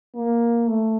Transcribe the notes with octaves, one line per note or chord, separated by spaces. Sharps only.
A#3
A3